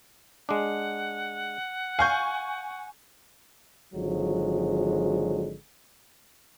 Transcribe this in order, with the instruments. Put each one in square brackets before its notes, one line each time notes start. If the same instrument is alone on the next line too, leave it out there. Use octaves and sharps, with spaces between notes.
[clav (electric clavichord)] G#3 D4 [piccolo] F#5
[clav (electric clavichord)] F5 [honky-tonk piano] G#5 C#6 G6
[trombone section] G#1 D3 F3 F#3 G#3